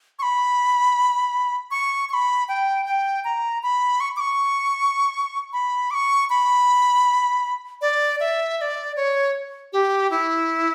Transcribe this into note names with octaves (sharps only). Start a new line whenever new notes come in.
C#6
B5
C#6
C#6
B5
G5
G5
A#5
B5
C#6
D6
C#6
B5
D6
C#6
B5
D5
E5
E5
D5
C#5
G4
E4